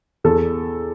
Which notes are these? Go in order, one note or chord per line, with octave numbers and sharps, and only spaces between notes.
E2 A4